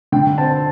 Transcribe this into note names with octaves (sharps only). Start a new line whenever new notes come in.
D3 G5
C4 A5